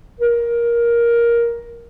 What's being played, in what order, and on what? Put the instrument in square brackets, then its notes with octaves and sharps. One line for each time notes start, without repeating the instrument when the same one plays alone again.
[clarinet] A#4